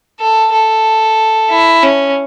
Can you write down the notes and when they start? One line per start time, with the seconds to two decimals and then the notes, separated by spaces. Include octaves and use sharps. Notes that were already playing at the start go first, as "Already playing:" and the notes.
0.19 A4
0.52 A4
1.50 E4
1.82 C#4